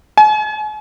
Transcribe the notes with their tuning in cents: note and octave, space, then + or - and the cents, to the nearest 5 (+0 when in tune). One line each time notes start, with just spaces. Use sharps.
G#5 +40